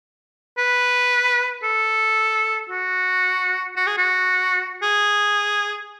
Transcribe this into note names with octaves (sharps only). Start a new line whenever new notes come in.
B4
A4
F#4
F#4
G#4
F#4
G#4